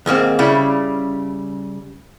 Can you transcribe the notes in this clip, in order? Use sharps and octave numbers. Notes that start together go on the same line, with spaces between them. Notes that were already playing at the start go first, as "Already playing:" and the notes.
D#2 G#2 A#3 C4
C#3 G3 E4